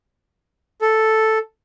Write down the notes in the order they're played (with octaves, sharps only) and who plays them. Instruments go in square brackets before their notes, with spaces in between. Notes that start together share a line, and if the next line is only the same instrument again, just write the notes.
[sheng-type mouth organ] A4